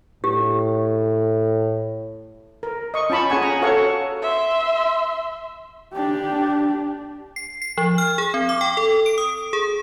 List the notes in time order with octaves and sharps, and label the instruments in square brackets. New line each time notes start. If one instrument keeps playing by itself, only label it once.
[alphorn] A2 [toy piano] G4
[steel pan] A#4
D#5 C#6
C#4 F4 A5 B5 C#6
C#4 G#4 F#5 G#5 C#6
G#4 G#5 A#5
F#4 A4 C#5 F5 F#5 C#6
[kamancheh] E5 C6
[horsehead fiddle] D4 G4
[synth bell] C7
C7
F3
F6
G#4
C4
D6
G5
A4
D7
D#6
G#4